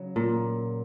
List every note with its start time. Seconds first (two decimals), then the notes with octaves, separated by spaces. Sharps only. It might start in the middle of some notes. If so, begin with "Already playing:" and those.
Already playing: C#3 F#3
0.16 A#2